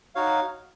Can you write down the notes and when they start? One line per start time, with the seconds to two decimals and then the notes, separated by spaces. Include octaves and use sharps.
0.15 D#4 F#4 C#5 F5